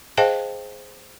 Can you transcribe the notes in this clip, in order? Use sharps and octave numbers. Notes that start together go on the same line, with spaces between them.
G#4 C5 D#5 F5 G5 A5